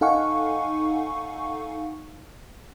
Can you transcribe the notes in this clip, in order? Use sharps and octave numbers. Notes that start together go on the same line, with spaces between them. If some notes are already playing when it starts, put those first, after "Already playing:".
D#4 A4 F5 F#5 G#5 C#6